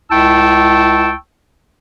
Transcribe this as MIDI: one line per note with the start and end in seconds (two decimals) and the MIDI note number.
0.10 1.13 37
0.10 1.13 64
0.10 1.13 79
0.10 1.13 81
0.10 1.13 85
0.10 1.13 88